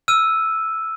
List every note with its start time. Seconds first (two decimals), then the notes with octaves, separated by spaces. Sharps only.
0.08 E6 F6 D#7